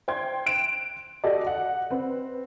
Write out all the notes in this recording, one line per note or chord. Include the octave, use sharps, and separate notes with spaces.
C5 G5 C6 G#6
F#6 D7 E7
F#4 G4 A4 D5 D#5
F#5
C4 B4